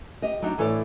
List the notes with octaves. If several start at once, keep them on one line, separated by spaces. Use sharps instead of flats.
G4 D#5
F#3 D4 D#4
A2 E3 A4 C#5 D5